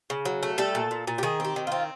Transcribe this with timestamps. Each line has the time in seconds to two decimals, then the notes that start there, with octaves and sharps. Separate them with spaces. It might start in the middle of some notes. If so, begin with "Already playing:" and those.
0.10 C#3
0.25 F#3
0.43 A3
0.58 G3 A4
0.75 A#2
0.91 A#2
1.07 A#2
1.18 G4
1.23 D#3 G#4
1.40 C4 G4
1.56 D#3
1.67 C4 F4